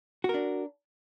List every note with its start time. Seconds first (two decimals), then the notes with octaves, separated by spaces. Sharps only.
0.24 F#4
0.29 A#4
0.34 D4